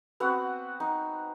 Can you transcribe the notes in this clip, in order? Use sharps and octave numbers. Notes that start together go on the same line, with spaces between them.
B3 C4 F#4 F#5
D#4